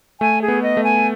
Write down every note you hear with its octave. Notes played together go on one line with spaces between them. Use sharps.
A3 G#5
G#4
B3
D#5
A3
G#5